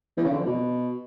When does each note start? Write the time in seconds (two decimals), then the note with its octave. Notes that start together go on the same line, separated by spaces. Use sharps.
0.17 E2
0.24 C#3
0.31 D3
0.39 F2
0.46 B2